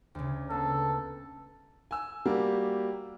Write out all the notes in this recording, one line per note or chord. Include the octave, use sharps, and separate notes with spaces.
D2 C#3
A#3 B3 A4
G#5 E6
G3 A#3 F#4 G4